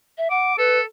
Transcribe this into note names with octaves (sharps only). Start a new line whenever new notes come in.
E5
F#5 D6
A4 B4